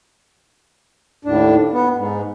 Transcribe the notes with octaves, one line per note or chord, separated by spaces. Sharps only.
D#2 A2 D4
B3
G#2